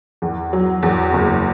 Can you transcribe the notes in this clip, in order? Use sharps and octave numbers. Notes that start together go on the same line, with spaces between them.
E2
F#3
E2
F#1